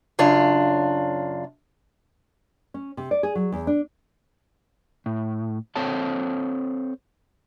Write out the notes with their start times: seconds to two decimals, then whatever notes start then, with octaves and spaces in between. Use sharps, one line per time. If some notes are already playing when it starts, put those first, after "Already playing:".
0.19 F#2 C#3 D4 F4
2.74 C#4
2.97 C3
3.11 D5
3.23 G#4
3.35 F#3
3.52 E2
3.67 D4
5.06 A2
5.76 C4 A4 C5 C#5 A5